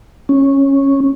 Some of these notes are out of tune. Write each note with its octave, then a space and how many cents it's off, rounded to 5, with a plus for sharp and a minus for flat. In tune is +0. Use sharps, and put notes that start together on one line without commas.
C#4 -10